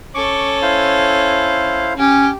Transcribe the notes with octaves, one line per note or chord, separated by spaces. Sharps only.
C#4 A4 C#6 D6
E4 C5 F5
C#4 G4